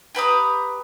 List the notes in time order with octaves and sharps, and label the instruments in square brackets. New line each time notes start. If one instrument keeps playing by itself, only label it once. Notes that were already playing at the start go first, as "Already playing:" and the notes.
[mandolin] G4 B4 A#5 D#6